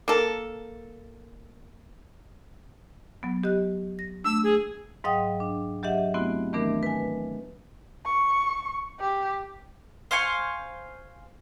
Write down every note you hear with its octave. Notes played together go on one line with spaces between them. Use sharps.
A#3 A4
F#3 B3
G4 D#5 F#6
A#6
A3 D4 E6
G#4
G#2 F#3 D#5 F5 G5 D#6
D4
F#3 G4 D#5 E5 F#5
A3 B3 C4 E4 F#4
D#3 E3 A3 B3 D4 A#4
B4 G#5
C#6
G4
C5 F5 G#5 C#6